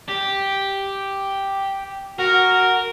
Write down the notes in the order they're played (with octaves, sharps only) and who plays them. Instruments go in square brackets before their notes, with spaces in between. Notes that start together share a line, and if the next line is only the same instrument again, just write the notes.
[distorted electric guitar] G4
[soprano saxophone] F#4 [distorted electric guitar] A#4